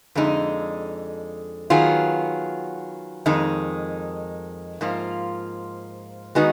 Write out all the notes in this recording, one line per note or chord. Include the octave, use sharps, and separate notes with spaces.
F2 D3 G#3 D#4
D#3 F#3 B3 F4 G#4
F2 D#3 G#3 D#4
G#2 F3 A#3 F4
D#3 G#3 B3 D#4 F#4